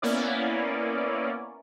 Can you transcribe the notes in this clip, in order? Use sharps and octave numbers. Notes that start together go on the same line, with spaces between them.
A#3 B3 C#4 E4 D5